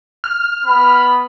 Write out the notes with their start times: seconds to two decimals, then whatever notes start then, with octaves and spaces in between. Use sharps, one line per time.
0.24 F6
0.66 B3 B5